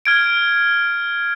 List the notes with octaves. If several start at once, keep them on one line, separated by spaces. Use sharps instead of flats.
F6 G#6 D7